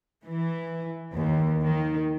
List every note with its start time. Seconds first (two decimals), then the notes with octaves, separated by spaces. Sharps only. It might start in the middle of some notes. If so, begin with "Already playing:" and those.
0.25 E3
1.13 D#2
1.64 D#3